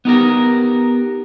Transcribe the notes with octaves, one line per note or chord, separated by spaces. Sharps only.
B3 D#4 G4 A#4